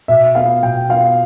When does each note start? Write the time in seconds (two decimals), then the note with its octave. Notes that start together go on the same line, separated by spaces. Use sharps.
0.08 B2 E5
0.35 B3 F4 F5
0.62 B2 G5
0.89 B3 F4 F5